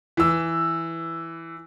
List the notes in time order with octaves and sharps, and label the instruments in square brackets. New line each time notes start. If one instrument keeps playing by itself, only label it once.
[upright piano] E3 E6